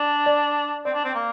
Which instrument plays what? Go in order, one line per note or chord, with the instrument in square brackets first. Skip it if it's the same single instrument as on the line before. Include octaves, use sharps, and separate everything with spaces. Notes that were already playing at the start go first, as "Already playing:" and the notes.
Already playing: [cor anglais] D4 [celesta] D5
[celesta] D5
[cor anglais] C4 [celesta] D5
[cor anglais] D4
C4
A#3